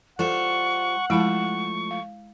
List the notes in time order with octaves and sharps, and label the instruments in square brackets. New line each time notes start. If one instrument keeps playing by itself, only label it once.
[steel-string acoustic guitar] G3 F4 C5 [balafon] A4 [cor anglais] F#5 [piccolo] C#6
[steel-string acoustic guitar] F3 A3 [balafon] G#3 E4 B5 [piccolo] C#6
[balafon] F5